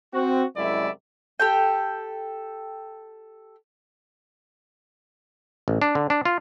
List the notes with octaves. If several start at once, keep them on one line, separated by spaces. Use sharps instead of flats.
C4 F#4
C2 F#2 G#3 E4 D5 E5
G4 A4 G5
A1
D4
D3
D4
F4